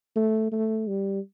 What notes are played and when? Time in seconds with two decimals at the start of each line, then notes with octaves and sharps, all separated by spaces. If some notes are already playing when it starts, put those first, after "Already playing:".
0.16 A3
0.52 A3
0.88 G3